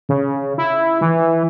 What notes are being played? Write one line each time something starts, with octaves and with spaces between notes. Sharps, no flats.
C#3
E4
E3